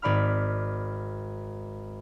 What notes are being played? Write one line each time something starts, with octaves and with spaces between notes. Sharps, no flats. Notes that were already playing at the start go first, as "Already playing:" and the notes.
G#1 D5 B5 F6